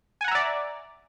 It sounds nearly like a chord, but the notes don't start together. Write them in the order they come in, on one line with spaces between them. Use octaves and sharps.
G#5 F#5 A#5 E5 D5